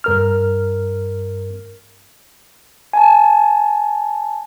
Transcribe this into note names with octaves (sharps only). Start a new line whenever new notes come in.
G2 A#4 F6
G#5 A5